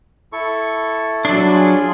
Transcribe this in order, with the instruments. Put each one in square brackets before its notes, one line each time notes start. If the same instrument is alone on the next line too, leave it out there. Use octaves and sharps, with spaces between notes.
[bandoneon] E4 A4 C#6
[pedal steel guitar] F#3 D4
[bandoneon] F4 G#4